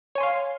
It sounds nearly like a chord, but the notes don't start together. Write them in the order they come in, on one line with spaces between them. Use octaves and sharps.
C#5 G#5 C6 F5